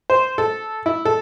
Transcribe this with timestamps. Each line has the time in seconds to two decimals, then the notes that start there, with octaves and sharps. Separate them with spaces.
0.10 C5
0.38 A4
0.86 E4
1.05 A4